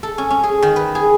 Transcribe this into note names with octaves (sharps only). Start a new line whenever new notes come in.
A4
C#4
C#4
G#4
D#3
B4
G#4